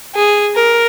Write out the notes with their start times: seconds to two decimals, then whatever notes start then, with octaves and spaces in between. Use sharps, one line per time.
0.15 G#4
0.55 A#4